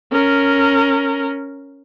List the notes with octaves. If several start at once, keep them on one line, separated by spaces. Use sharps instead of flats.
C#4 A#4